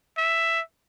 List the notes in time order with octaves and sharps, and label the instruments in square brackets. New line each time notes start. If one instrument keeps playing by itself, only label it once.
[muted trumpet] E5